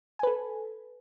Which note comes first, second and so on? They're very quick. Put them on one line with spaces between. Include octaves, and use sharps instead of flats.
G#5 B4 A4